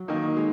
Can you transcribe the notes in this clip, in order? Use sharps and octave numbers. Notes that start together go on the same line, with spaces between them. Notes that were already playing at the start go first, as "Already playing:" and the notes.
Already playing: F#3
D#3 A#3 D#4
G#3